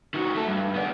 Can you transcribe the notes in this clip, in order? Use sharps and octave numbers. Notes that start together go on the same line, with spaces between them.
D#3 F#4
A3 A4
G2
B3 D5